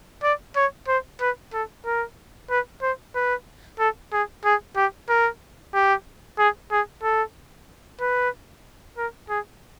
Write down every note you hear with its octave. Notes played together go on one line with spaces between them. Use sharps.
D5
C#5
C5
B4
A4
A#4
B4
C5
B4
A4
G#4
G#4
G4
A#4
G4
G#4
G#4
A4
B4
A#4
G#4